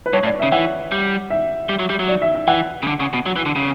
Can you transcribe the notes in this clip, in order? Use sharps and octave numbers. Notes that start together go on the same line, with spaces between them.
B4
G2 C#5
A2 D5
C#3 E5
E3 F#5
G3
E5
G3
F#3
G3
F#3
D5
E5
E5
E3 F#5
C#3
D3
C#3
B2
F#3
E3
D3
C#3